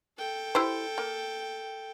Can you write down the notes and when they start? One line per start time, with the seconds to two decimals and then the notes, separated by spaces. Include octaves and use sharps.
0.18 A4 G5
0.55 E4 G4 C5
0.98 A#3